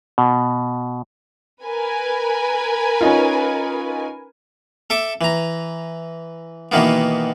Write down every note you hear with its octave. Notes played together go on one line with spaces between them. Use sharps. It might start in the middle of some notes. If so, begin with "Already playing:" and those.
B2
A#4 B4 G#5
C#4 D#4 F4
A4 E5 D6
E3 A#5
B2 D#3 E3 A#3 B3